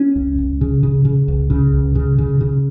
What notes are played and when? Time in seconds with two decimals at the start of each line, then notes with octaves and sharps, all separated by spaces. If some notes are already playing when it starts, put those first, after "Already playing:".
Already playing: C#4
0.16 C#2
0.38 C#2
0.61 C#3
0.83 C#3
1.05 C#3
1.28 C#2
1.50 C#3
1.74 C#2
1.95 C#3
2.18 C#3
2.41 C#3